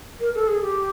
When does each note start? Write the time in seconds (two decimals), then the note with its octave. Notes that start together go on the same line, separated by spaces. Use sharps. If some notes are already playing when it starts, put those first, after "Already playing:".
0.20 A#4
0.34 A4
0.47 G#4
0.61 G4